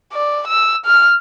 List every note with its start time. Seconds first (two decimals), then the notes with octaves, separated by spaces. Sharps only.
0.13 D5
0.47 E6
0.86 F6